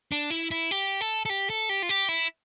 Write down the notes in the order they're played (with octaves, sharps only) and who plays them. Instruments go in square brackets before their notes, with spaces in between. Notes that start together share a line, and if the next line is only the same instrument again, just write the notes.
[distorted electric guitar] D4
E4
E4
G4
A4
A4
G4
A4
G4
F4
G4
E4